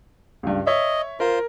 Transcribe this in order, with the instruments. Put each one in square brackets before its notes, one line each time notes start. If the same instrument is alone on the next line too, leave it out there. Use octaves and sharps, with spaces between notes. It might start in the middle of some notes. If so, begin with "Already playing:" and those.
[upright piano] C#2 G2
[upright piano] C#5 E5 [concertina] D#5
[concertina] F4 C5 [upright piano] A#4